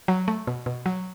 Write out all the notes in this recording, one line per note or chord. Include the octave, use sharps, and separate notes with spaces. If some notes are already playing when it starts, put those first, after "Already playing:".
F#3
A3
B2
B2
F#3